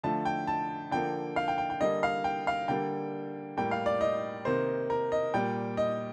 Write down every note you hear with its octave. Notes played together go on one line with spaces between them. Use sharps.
D3 F3 A3 A5
G5
A5
D3 F3 A#3 G5
F5
G5
G5
G5
D3 G3 A#3 D#5
F5
G5
F5
D3 G3 A#3 G5
A2 G3 A#3 G5
F5
D5
D#5
C3 D#3 A#3 C5
A#4
D#5
A#2 G3 A#3 G5
D#5